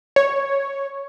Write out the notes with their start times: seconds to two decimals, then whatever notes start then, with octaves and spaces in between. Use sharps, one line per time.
0.16 C#5